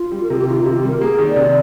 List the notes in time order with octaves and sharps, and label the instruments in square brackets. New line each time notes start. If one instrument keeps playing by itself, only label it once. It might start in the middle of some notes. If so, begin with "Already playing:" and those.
Already playing: [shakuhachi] F4
[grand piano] G3
[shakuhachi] A#4
[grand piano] C3 [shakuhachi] G#4
[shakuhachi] G4
[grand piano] D#3 [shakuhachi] F4
[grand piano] C3 [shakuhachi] F4
[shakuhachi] G4
[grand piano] G3 [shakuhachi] A#4
[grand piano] A#3 [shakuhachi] G#4
[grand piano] D#3
[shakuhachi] D5
[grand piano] C3